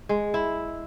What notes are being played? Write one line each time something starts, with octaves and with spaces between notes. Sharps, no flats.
G#3
E4